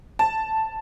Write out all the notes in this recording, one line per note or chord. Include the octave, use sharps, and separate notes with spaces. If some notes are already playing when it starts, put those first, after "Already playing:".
A5